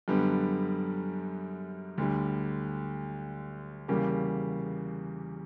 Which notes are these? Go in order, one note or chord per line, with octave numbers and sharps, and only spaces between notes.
F#2 D3 G3 B3
D2 D3 G3
E2 C#3 G3 A#3